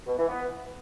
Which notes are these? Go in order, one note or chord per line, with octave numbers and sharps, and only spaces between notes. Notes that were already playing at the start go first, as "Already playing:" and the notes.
B2
E3
B3